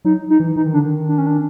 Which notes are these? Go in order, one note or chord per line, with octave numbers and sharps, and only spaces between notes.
F#3 D#4
D#4
E3
E3 D#4
D#3
D3 D4
D#3
D4
C#4
D4